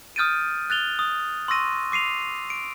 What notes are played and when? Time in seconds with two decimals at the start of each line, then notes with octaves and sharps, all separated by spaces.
0.16 D#6 F6 G6 A6 D7 D#7
0.70 F#6 A6 F7 G7
0.99 D#6
1.48 C6 C#6 E6 A#6 D#7
1.92 D6 C7 D#7 F7
2.50 D7